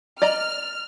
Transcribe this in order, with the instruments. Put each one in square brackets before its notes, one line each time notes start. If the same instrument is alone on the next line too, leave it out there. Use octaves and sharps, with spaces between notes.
[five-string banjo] D5 D#5 A#5 [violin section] F6